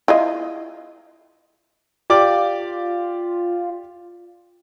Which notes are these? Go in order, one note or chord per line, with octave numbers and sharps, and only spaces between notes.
E4 F4 D#5
F4 G4 D5 D6